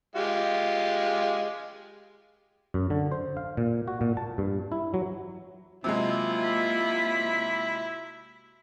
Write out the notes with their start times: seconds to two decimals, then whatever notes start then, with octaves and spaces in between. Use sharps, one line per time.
0.16 G#3 F4 G4
2.74 F#2
2.90 D3
3.12 C5
3.37 F5
3.57 A#2
3.88 F#4
4.01 A#2
4.17 A5
4.38 G2
4.72 E4
4.94 F#3
5.84 C3 F#3 G#3 A#3 E4 F4
6.44 B5